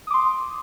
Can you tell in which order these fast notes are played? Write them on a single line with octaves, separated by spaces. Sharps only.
D#6 D6 C6